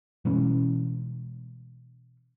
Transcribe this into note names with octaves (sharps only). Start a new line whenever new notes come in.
B2 E3 G#3 C#4